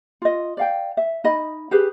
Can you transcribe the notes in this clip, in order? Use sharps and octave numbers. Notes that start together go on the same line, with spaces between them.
F4 D#5
D5 F5 G5
E5
D#4 D#5 B5
G4 G#4 B4